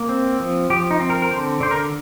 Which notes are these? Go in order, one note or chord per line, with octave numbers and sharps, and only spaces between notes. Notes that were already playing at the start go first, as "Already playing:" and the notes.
Already playing: A#3
C4
F3
F3 G4
D#4
C4
A#4
A#4
D3 C5
D3 C5
A#4